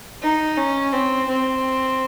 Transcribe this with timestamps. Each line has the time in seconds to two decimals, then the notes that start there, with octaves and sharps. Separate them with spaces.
0.22 D#4
0.57 C#4
0.93 C4
1.28 C4